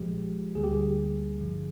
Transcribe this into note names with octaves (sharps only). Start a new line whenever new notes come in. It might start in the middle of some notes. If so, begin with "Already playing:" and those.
Already playing: A#1 A#2 F3 G#3 G4
D2 D3 G3 A#3 G#4
G4
G#4
G#1 G2 D3 F3